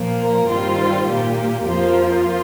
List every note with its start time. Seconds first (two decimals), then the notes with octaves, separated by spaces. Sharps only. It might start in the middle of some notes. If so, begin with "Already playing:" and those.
Already playing: A#2 F3 A#3
0.19 A#4
0.47 G2 D#3 G3 C4 F4
1.07 A#2 A#3 G4
1.65 F2 F3 A#3 F4
1.95 F4